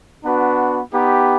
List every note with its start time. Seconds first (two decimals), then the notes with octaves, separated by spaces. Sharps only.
0.24 B3 D4 F#4 B4
0.93 B3 D#4 G4